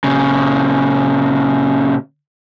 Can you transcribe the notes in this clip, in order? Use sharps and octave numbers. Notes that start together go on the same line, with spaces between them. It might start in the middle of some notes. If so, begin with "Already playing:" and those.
A#2 C#3